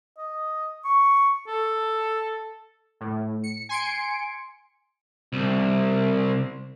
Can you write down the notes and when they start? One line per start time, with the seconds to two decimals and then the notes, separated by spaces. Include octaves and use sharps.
0.18 D#5
0.85 C#6
1.48 A4
3.01 A2
3.44 C#7
3.69 G#5 C6 C#7 D7
5.33 C2